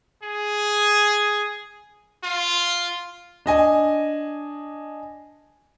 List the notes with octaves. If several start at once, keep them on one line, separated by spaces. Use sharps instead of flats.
G#4
F4
D4 D#5 G#5